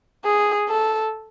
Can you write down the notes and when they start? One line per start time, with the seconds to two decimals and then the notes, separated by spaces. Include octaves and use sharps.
0.25 G#4
0.69 A4